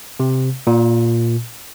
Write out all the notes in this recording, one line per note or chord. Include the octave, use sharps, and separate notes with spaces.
C3
A#2